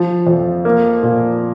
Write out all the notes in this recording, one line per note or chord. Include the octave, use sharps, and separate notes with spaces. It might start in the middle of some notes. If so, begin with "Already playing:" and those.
Already playing: F3
F2
A#3
A#2